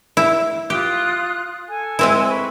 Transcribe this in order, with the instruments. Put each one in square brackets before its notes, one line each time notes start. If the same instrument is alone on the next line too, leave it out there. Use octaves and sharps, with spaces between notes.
[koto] E4
[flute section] F4 D#6 F#6 [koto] G4
[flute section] A4 G#5
[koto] G#3 C4 E4
[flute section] B4 B5 C#6